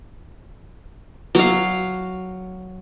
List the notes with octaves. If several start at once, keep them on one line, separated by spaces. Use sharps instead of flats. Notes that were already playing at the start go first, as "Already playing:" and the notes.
F#3 F5